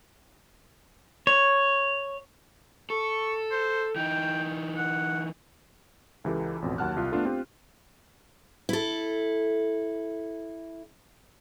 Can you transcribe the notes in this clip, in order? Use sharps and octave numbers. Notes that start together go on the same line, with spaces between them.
C#5
A4 C#6
C5
E3 D#4 G5
F#5
C#2 E3 G4 A4
A1 F2 B2
D#2 F#3 F#5 A5 F6 F#6
C2 F4
A3 B3 D4 F4 A4
C4 F4 G4
E4 A4